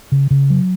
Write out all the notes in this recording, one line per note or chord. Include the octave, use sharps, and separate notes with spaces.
C#3
C#3
F#3